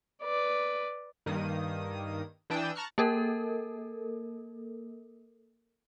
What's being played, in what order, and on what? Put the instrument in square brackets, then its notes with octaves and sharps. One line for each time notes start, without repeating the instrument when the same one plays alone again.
[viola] B4 D5
[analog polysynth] G2 D#3 A#3 D#6
E3 D4 G5 D#6 E6
A5 A#5 C#6 F6 F#6
[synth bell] A#3 A4 A#4